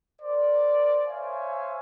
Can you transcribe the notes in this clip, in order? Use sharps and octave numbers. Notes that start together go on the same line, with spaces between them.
A#4 C5 D5
C5 C#5 E5 F5 G#5